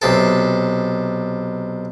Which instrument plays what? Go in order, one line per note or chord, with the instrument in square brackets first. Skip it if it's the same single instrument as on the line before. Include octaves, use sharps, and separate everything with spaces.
[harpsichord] B1 C3 A4